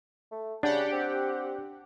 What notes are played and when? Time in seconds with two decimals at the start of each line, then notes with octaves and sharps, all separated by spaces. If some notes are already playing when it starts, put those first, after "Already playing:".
0.32 A3
0.63 C#3 D4 G4 F#5
0.93 C4